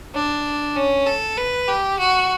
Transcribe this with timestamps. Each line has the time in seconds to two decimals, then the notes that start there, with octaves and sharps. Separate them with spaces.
0.15 D4
0.76 C#4
1.07 A4
1.37 B4
1.68 G4
1.99 F#4